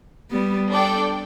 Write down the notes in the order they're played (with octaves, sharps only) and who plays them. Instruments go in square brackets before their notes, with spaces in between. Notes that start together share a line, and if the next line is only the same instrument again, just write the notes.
[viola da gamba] G3 B3
[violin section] D4 A4 D5 G5